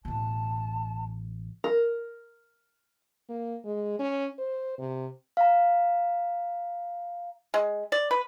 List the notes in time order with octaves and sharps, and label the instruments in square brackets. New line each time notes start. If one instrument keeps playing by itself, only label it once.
[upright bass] A1 B2 [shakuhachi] A5
[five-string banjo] A#4
[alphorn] A#3
G#3
C#4
C5
C3
[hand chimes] F5 A#5
[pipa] G#3
D5
B4